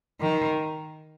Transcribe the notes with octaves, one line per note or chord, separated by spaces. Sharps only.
D#3